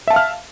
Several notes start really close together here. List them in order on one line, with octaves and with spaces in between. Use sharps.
E5 A5 F5 F6